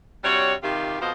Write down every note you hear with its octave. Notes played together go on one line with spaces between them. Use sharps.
C3 G3 D4 F#4 C#5
C3 D#3 F4 G4
F2 B2 F3 F4 C5 D#5